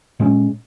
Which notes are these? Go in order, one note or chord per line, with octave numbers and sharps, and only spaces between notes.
A#2 G#3 C#4